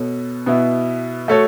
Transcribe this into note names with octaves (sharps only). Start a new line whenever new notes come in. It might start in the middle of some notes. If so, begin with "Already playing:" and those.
Already playing: B2 B3 A4 C#5
B2 B3 E4
A3 F#4 A4 C#5